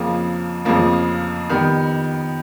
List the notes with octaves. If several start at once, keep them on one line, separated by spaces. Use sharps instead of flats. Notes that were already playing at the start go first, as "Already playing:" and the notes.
Already playing: F2 C#3 F3 A#3
F2 C#3 F3 A#3
D#3 G3 B3